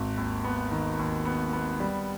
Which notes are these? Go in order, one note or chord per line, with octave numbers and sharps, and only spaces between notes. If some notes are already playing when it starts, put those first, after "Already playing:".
Already playing: G#1
D#2
B3
D#3
D#2
B3
B3
G3